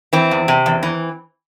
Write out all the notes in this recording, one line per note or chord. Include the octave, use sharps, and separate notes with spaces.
E3 C4
E2
C3
E2
E3